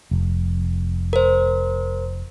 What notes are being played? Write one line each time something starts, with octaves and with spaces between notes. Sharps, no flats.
F1
A#4 C5